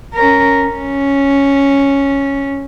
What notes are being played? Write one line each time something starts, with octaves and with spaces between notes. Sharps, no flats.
C#4 A#4
C#4